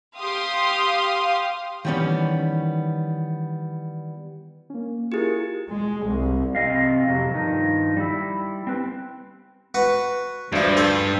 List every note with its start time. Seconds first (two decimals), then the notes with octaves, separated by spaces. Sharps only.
0.17 G4 F5 C6 D#6
1.85 D#3 E3 G3 B3 C#4
4.70 A#3 C#4
5.12 E4 F4 G4 G#4 A#4
5.68 G#3
6.07 C2
6.55 C3 C4 D#5 F5
7.06 F2 A2 C3 F#3
7.33 G2 D#3 F3 D#4
7.97 G3 E4
8.67 C4 B4 G5
9.74 F#4 B4 F#5
10.53 D2 G2 F3
10.77 A4 C5 G#5